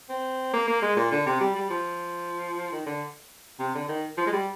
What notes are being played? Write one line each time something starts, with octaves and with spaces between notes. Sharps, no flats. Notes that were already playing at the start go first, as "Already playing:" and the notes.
C4
A#3
A#3
G#3
A#2
D3
C3
G3
G3
F3
D#3
D3
C3
D3
D#3
F3
G#3
G3